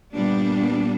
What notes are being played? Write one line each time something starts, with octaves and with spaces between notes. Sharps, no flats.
A#2 G3 B3 D4